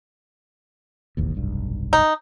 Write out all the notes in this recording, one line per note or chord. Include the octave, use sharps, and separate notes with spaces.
E1 A1 D#2
F1 B1 G2
D#4